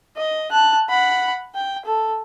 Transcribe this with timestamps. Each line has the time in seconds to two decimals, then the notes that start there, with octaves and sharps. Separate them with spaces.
0.17 D#5
0.51 A5 F#6
0.90 F#5 B5
1.55 G5
1.86 A4